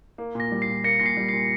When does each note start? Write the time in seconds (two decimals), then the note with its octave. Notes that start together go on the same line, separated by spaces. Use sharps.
0.18 A#3
0.35 A#2 A#6
0.52 G3
0.62 C7
0.68 A#2
0.84 A#3 A#6 C#7
1.00 A#2 A#6
1.06 C7
1.17 G3
1.29 A#2 C7